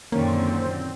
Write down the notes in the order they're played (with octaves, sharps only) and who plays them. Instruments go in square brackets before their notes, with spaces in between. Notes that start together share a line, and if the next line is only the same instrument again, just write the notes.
[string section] F#2 A#2 D3 [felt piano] D#3 C#4 [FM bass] A#3 [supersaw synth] C4